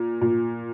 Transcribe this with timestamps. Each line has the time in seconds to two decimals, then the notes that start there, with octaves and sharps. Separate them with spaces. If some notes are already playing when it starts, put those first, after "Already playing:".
Already playing: A#2
0.21 A#2